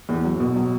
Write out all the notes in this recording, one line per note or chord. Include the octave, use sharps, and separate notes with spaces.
E2
F#3
B2
F#3